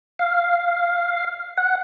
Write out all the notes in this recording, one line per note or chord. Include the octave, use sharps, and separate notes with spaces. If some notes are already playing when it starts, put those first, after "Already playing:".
F5
F#5